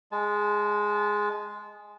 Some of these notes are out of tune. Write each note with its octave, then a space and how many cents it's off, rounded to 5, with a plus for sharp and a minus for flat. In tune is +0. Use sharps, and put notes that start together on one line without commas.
G#3 +0 A5 -30